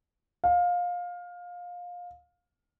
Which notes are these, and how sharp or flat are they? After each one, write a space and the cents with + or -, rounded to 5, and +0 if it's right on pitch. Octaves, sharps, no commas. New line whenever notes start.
F5 +20